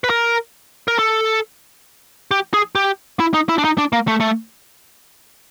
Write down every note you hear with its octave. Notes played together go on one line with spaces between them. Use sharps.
B4
A#4
A#4
A4
G4
G#4
G4
E4
D#4
E4
D4
D#4
D4
A#3
A3
A3